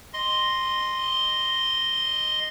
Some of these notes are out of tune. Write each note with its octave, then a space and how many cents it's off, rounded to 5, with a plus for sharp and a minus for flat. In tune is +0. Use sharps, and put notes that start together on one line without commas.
D#5 -10 C6 +0